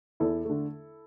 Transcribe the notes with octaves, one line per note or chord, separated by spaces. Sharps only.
E2 E4 A4
D3 A3